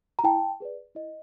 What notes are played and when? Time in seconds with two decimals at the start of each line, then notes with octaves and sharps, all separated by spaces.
0.19 A#5
0.24 E4 G5 A5
0.60 G#4 B4 D5
0.95 E4 D#5